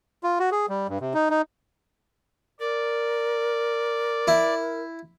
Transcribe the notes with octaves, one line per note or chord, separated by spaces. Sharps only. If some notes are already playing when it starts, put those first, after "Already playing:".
F4
F#4
G#4
G3
G2
C3
D#4
D#4
A#4 D5
E4